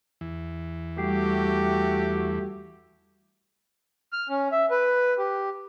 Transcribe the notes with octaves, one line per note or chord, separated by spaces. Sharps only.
E2 E3
G3 A3 F#4 G4
F6
C#4
E5
B4
G4